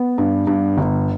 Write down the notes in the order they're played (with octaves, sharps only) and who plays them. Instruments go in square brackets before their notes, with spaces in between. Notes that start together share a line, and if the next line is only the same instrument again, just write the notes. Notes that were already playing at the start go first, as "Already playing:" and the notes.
Already playing: [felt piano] B3
G2
G2
G1